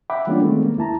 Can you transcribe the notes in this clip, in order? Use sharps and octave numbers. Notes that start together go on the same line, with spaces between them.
E5 F#5 G5 B5 D6
E3 G3 A#3 C#4 D4 F4
D#3 G#3 A3 B3 C4
A#3
D#2 E4 A5 A#5